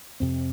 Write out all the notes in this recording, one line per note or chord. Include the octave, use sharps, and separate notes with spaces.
F2 C3 C4